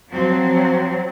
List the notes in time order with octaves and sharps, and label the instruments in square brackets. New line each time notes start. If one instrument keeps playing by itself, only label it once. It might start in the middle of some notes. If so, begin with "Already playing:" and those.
[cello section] F3 F#3 C4